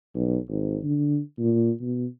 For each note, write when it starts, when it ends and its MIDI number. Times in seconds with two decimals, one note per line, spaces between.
0.15 0.37 35
0.48 0.78 32
0.83 1.19 50
1.39 1.72 46
1.81 2.06 47